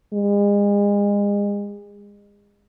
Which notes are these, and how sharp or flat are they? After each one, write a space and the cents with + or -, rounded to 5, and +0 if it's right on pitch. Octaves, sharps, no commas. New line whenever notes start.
G#3 -35